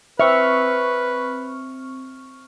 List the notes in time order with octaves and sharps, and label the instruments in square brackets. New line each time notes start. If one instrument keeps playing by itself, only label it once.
[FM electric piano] C4 C#6 F6 [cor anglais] B4 [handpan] E5